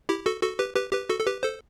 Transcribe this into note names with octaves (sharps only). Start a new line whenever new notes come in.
E4 G4
F#4 A4
F#4 A4
G4 B4
G4 B4
G4 B4
F#4 A4
A4
G4 B4
A4 C5